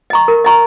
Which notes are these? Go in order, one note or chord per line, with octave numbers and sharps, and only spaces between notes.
D#5 A#5 C#6
A#4
D#5 A#5 C#6